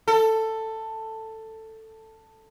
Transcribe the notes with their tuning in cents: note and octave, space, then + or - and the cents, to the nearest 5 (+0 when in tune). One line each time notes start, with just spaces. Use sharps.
A4 +10